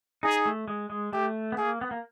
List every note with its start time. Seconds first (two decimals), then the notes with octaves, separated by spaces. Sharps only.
0.23 D#4 G#4
0.46 A3
0.68 G#3
0.90 G#3
1.13 A3 G4
1.52 B3
1.57 A#3 G#4
1.81 B3
1.91 A#3